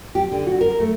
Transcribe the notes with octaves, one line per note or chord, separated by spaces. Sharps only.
G4
D3
F#4
A#4
A3